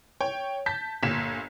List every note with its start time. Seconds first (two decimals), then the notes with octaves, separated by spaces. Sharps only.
0.21 C#5 G5
0.66 A5 G6 B6
1.03 G1 A#2 B6 E7